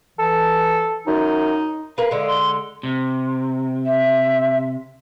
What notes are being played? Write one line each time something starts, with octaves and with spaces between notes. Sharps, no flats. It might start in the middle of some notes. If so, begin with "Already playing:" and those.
E3 A4
F#2 D#4
A#4 B4 F5
D3 G#3
C6
C3
E5